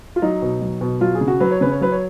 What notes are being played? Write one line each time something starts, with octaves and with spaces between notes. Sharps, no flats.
F4
F#3 D#4
B2
F#3
B2
F#3 F4
G#4
C#3
F#4
F#3 B4
C#5
C#3 B4
C#5
F#3 B4
C#5